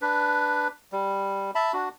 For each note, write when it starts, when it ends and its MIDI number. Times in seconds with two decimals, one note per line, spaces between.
0.02 0.68 62
0.02 0.68 71
0.92 1.51 55
1.55 1.73 76
1.55 1.73 81
1.55 1.73 83
1.73 1.89 62
1.73 1.89 66